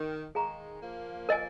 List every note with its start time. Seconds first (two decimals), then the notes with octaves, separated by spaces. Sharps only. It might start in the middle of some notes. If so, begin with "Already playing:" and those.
Already playing: D#3
0.35 D#3 G#3 G#4 F5 A#5 C#6
0.82 F3 A#3
1.29 A#4 D#5 G#5